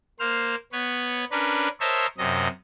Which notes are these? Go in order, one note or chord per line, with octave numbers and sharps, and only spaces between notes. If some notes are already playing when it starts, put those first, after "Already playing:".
A#3 C5 F6
B3 B4 C#5
C#4 D4 A#4 B4
A#4 C5 C#5 D#5 E5 A5
F#2 C3 D#5